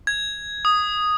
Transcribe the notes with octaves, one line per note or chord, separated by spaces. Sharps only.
G#6
D#6